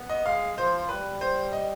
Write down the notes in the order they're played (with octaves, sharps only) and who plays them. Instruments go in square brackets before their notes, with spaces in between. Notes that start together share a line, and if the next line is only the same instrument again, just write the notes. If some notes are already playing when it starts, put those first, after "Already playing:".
Already playing: [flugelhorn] B3
[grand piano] D#5
[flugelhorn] G#3 [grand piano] F5
[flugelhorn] F3 [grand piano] C5
[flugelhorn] G3 [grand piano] B4
[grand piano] C5
D#5